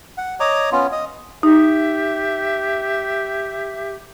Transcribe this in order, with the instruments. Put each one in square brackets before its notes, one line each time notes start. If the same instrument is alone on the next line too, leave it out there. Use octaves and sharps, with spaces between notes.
[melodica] F#5
C#5 D#5 A#5 D6
B3 C#4 F4
D#5
[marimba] D#4 [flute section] G4 E5